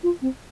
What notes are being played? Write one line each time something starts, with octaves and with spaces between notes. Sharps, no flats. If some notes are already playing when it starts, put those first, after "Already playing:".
F4
C4